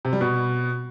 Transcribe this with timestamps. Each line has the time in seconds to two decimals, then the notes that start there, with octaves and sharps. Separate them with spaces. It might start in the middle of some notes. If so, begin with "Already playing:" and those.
0.05 C3
0.13 G3
0.21 B2